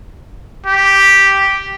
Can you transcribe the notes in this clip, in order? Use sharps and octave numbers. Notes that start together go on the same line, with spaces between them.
G4